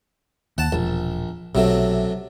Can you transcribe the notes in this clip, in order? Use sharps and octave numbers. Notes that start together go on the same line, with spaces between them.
D#2 F#5 A5
E1 A#1
B1 C3 F#3 A3